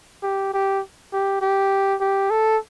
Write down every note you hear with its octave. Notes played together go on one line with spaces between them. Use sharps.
G4
G4
G4
G4
G4
A4